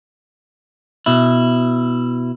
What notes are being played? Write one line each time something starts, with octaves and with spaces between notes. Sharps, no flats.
B2 E4